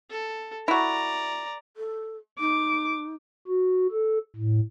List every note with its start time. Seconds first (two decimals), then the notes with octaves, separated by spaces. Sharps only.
0.11 A4
0.68 E4 F#4 D5 A#5
1.77 A4
2.40 D#4 D6
3.47 F#4
3.91 A4
4.36 A2